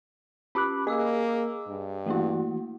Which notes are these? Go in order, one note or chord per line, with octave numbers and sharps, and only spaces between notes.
C#4 G4 B5 D6 F#6
A#3 G#4 D#5 D6 E6
G2
E3 A3 A#3 E4 F#4